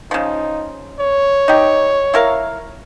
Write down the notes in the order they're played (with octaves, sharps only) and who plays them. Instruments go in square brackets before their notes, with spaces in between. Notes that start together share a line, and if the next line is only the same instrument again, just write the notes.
[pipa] C#3 F3 [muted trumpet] D#4
[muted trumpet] C#5
[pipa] D#4 G4
E4 A#4 F5